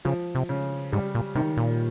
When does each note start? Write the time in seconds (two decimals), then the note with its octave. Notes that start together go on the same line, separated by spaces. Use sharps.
0.05 C#3 F3
0.35 C3
0.49 C#3
0.92 G#2 G3
1.15 A#2
1.35 C3 D#3
1.57 A#2